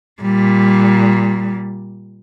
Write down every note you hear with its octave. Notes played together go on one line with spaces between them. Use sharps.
A#2 G3